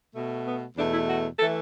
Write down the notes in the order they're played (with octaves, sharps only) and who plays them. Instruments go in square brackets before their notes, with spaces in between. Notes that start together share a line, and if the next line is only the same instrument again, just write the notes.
[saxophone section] B2 A3
B3
E2 B2 A3 D4
E4
F#4
E3 A3 A4